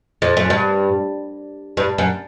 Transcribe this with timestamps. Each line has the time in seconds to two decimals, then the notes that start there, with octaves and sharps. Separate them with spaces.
0.22 F2
0.37 F#2
0.50 G2
1.77 G2
1.98 F#2